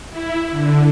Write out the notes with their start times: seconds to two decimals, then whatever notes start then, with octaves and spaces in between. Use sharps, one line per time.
0.10 E4
0.50 D3